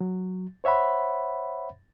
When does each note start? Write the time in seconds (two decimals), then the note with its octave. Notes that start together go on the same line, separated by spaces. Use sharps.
0.01 F#3
0.64 C5 C#5 E5 F#5 B5